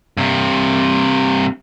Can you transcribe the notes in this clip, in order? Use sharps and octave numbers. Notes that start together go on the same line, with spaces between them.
G2 C3